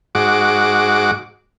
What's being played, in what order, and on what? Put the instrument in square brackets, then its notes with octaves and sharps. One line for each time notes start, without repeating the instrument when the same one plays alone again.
[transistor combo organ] G#2 F#4 D6